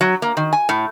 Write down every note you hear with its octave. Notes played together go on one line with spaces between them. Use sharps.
F#3
A#3
D#3
G#5
A2